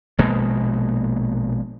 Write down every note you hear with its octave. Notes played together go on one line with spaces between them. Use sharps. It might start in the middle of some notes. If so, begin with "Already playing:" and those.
A#1 B2 G#3 A#3